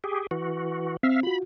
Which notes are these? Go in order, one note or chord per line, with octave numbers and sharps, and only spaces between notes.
G4 G#4
E3 F#4
C4 E5 F5
F4 F#4 B5